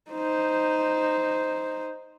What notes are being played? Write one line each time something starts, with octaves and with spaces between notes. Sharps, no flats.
D#4 C5